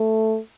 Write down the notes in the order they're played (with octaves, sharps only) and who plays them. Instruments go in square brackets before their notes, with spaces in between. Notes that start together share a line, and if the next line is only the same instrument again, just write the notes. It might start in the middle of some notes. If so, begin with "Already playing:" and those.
Already playing: [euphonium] A3